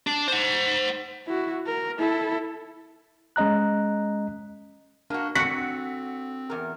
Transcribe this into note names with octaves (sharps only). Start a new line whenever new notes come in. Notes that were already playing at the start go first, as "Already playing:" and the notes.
D4
C5 F#5
E4 F#4
A#4
E4 A4
G#3 C#4 D#5 A#5 F#6
A#3 D4 F#4
D3 C4 F#4 B6 C#7
E2 A#4